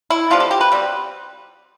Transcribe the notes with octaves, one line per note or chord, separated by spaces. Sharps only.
E4
C3 F3 B3 D4 F4
A4
G4
B4
B2 G3 C4